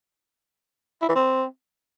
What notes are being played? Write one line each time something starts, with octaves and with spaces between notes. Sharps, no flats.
E4
E3
C4